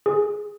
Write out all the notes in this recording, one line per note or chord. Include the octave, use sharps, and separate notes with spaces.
G#4